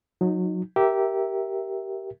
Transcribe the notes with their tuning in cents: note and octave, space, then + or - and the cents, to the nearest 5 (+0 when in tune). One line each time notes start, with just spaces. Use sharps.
F#3 -25 D#4 +0
G4 -15 A#4 +0 E5 +0